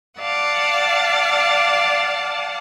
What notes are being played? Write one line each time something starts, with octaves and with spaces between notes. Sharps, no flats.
D5 F5 F#5 A5